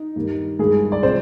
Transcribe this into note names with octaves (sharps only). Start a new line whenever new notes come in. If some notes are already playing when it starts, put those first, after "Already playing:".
Already playing: D#4
G2 D#3 G3 A#3
G2 D#3 G#3 G#4
D5
C3 F3 C4 C5